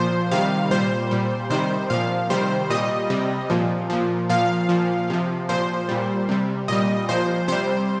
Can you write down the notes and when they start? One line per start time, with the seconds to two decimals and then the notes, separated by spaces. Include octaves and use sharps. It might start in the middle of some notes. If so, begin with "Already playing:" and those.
Already playing: A#2 F3 C5
0.31 C3 D#3 G3 F5
0.71 A#2 G3 C5
1.11 A#2 G3
1.50 C3 D#3 G3 C5
1.90 A#2 F3 F5
2.30 C3 D#3 G3 C5
2.70 A#2 G3 D#5
3.10 C3 G3
3.50 A#2 F3
3.90 A#2 F3
4.29 A#2 F3 F5
4.69 A#2 F3
5.10 C3 F3
5.49 A#2 F3 C5
5.89 A#2 G3
6.29 C3 G3
6.68 A#2 G3 D#5
7.09 A#2 F3 C5
7.48 C3 G3 C5